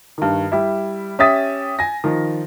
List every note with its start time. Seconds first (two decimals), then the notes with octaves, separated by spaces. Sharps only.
0.18 G2 D#3
0.52 G3 E4
1.19 C#4 G4 E5 D#6 A6 B6
1.79 G#5 A#6
2.04 D#3 F3